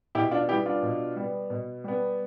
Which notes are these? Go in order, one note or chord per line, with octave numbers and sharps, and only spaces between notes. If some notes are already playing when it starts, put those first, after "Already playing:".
B2 E4 G4
D4 F4
G3 B3 E4 G4
D4 F4
B2
G3 B3
B2
G3 B3